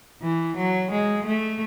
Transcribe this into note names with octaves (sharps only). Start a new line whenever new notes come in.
E3
F#3
G#3
A3